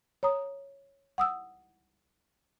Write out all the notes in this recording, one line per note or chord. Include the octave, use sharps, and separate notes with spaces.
C#5 A#5 D#6
F#5 D#6 E6